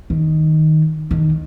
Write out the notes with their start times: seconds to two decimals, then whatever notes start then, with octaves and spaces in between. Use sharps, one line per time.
0.10 D#3
1.11 D#3